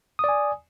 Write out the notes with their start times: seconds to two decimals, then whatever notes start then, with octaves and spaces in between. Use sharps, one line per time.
0.19 D#6
0.24 D5
0.29 G#5